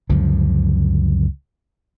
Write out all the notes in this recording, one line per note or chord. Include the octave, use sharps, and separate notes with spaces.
C#2 F#2 D3 F3